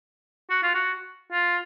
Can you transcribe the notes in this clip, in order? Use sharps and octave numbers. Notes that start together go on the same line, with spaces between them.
F#4
F4
F#4
F4